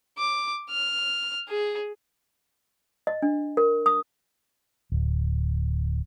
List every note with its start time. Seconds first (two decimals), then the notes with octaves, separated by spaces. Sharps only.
0.18 D6
0.70 F6
1.49 G#4
3.07 D#5
3.22 D4
3.57 A#4
3.86 D#6
4.92 D1